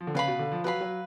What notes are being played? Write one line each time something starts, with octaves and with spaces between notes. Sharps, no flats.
F3
D3
C#3 B4 F5 B5
B2
D3
F3
F#3 B4 F5 B5
F#3